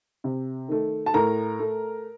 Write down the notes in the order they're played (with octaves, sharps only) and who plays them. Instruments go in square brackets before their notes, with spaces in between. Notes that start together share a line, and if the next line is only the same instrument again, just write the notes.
[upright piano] C3
D#3 A3
A5
A2 A#4 A#5
A3